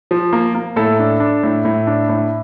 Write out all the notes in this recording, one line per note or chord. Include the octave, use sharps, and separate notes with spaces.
F3
A#3
A#3
A2 A4
D4
D4
A2
A2
D4
A2